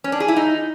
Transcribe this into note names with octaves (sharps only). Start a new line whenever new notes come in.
C#4
D4
G#4
E4
D#4